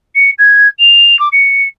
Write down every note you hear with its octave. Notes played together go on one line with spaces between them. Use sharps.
C#7
G#6
F7
D6
C#7